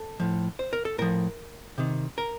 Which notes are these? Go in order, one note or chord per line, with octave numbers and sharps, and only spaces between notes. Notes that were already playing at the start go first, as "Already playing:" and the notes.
Already playing: A4
A2 F3
C5
A#4
A4
A2 F3 A#4
C3 D#3
A#4